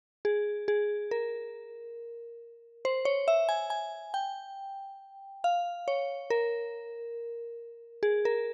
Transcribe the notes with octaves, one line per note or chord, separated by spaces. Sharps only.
G#4
G#4
A#4
C5
C#5
E5
G#5
G#5
G5
F5
C#5
A#4
G#4
A#4